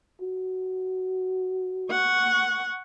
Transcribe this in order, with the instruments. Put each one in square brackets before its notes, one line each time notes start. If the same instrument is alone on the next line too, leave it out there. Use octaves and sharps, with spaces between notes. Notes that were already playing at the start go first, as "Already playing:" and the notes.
[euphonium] F#4
[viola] F#5 C#6